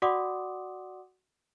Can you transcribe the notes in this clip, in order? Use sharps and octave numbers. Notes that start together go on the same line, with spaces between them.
F#4 D5 F#5 C6 D6 D#6